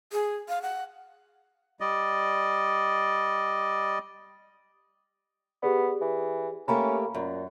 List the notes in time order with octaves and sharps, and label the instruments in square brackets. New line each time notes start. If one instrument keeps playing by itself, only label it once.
[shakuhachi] G#4
F5
F#5
[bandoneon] G3 D5 D#5
[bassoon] B3 [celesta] G4 G#4 D5
[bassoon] E3
[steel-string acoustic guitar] A3 A#3 G4 [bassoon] C#4 [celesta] A#5 B5
[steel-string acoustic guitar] F#2 [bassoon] A#2